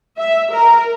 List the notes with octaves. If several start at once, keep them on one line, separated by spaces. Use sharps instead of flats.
E5
A#4